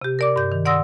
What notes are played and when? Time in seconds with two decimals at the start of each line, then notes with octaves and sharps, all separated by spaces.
0.02 C3 G4
0.19 A#4 D5 D6
0.36 G2 G6
0.52 D#3
0.65 D5 F#5 C6 D#6 E6 A#6